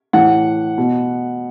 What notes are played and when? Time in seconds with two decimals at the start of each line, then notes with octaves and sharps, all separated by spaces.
0.13 A2 E3 F#5
0.78 B2